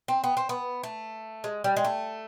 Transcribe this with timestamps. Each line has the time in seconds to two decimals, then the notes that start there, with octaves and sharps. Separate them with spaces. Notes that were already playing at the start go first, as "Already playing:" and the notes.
0.08 C4
0.24 B3
0.37 C4
0.49 B3
0.83 A3
1.44 G#3
1.64 G3
1.77 G#3
1.85 A3